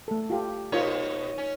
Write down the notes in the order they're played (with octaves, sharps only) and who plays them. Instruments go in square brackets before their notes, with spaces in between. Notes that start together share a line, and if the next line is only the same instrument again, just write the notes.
[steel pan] A3 A4
F4 G4 A4
[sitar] B2 D#4 C#5 [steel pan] F4 A#4
[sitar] C#4